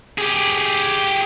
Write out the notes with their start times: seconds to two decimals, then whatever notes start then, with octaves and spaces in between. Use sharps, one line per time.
0.18 G4 G#4